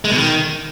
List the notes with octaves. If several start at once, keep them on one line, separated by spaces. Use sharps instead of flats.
G#3
B2
D#3